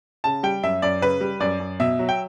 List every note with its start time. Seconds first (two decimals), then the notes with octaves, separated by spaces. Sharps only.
0.24 C#3 A5
0.43 G3 G5
0.63 F#2 E5
0.82 F#2 D5
1.01 C#3 B4
1.21 G3
1.40 F#2 D5
1.60 F#2
1.80 B2 E5
1.99 F#3
2.09 G5